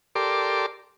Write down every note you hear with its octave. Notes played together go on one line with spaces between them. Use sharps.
G4 A4 A#4 D5 C6 D6